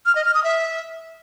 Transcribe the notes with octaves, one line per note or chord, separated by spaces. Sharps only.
F6
D#5
F6
D#6
E5